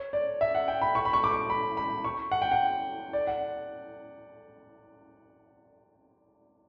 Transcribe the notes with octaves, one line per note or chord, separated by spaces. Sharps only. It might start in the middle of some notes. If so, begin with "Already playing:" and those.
Already playing: C#5
D5
E5
F#5
G5
B5
C#6
B5
C#6
D6
C#6
B5
B5
C#6
F#5
G5
F#5
D5
F#5